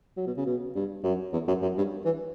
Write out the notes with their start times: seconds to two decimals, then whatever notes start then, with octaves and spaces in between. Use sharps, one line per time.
0.17 F#3
0.27 B2
0.37 C#3
0.46 B2
0.76 G2
1.04 F#2
1.33 E2
1.48 F#2
1.62 F#2
1.77 G2
2.05 E3